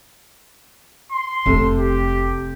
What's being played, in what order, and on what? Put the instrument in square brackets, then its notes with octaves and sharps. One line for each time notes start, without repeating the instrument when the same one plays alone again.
[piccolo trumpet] C6
[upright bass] F1 [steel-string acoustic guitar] C3 A3 A4
[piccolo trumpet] G4